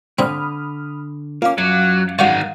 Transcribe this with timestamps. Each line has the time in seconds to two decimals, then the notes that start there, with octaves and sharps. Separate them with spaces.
0.19 A#2 D3 C4 B5 D#6 F6
1.42 A#3 C#4 F4 F5 D6
1.58 F#2 F#3
2.19 D#3 G#3 F#4 D5 F5 F#5 C#6